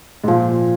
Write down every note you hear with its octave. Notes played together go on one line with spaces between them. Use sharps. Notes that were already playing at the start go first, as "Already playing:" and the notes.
G#2
A#2 F3